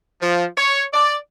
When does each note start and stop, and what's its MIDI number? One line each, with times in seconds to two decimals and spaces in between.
0.21 0.45 53
0.57 0.83 73
0.93 1.16 74